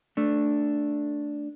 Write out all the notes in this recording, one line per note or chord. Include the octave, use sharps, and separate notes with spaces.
A3 D4